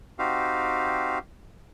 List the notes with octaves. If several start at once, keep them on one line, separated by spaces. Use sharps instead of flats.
C4 D#4 F#4 G4 F5